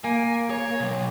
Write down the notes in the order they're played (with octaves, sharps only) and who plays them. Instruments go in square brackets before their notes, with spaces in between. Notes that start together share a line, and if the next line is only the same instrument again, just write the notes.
[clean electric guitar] A#3 [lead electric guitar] G#5
[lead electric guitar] C#5
B2 F#3